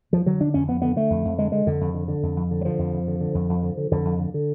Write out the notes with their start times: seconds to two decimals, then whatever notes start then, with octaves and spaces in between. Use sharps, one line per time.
0.12 F2 F3
0.26 D3 F#3
0.41 D3 D4
0.54 F2 C#4
0.68 F2 B3
0.82 D3 B3
0.96 D3 A3
1.10 F2
1.25 F2
1.38 D3 G#3
1.52 D3 G#3
1.66 F2 D3
1.81 F2
1.95 D3
2.08 D3
2.23 F2
2.37 F2
2.51 D3
2.61 F#3
2.65 D3 F3
2.78 F2
2.94 F2
3.08 D3
3.21 D3
3.35 F2
3.49 F2
3.63 D3
3.77 D3
3.91 F2 D3
4.05 F2
4.19 D3
4.34 D3